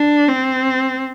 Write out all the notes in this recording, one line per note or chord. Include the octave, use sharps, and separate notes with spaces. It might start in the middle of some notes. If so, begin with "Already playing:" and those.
Already playing: D4
C4